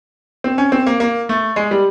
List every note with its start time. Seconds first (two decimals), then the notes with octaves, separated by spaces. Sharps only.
0.44 C4
0.58 C#4
0.72 C4
0.87 A#3
1.00 A#3
1.29 A3
1.56 G#3
1.71 G3